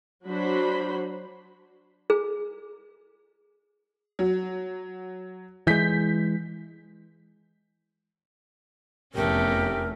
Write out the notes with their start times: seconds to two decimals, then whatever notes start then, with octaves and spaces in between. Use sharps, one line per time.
0.25 F#3 D4 F#4 C5 B5
2.10 G#4
4.19 F#3
5.67 E3 G#3 G6 B6
9.14 F1 E2 A3 C#4 G4 A#4